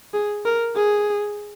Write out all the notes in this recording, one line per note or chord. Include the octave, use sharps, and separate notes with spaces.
G#4
A#4
G#4